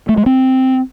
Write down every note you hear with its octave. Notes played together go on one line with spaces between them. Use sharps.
A3
G#3
C4